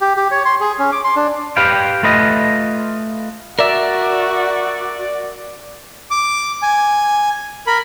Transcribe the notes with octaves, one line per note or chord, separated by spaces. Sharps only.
G4
G4
C#5
C6
G#4
C#4
D6
C6
D4
G4 B4 F5 G5
A3 F4 B4 D#5
F#4 A#4 D5 E5
D6
G#5
A#4 B5